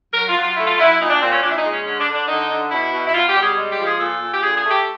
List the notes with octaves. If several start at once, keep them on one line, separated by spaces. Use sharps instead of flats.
F#3 A#4
F4
F#3
F4
A3 E4
F4
F#3 E4
A#2 D#4
D4
A#2 C4
C#4
A#2 D4
E4
D#4
G#3
C#4
D3 C#4
D4
D3
D4
D3 D#4
D3
B2 E4
B2
E4
B2 F4
G4
G3
G#4
G#3
G4
F3
G#4
A#2 A4
A#2
G4
D3 G#4
G#4
A3
G4